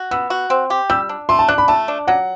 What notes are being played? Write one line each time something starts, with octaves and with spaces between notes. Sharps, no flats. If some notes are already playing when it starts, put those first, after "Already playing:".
Already playing: F#4
B3 E6
F#4
C4
G4
G3 E6
D4
A3 C6
A5
D4 F#6
B5
A3 A5
D4
F#3 F#5